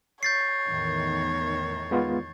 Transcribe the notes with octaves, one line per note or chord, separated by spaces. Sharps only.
C#5 G6 A6 C7
E2 A2 D#3
G#3 B3 F4